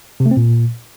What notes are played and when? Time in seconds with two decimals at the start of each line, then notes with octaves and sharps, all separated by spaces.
0.20 C3
0.26 A3
0.31 C4
0.37 A#2